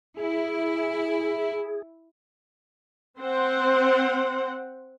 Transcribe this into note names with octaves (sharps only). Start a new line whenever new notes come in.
E4 G#4
C4 C5 F#5